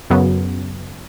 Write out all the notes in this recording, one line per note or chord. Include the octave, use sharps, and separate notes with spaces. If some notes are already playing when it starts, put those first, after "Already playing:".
F#2 C#3 F#3 B3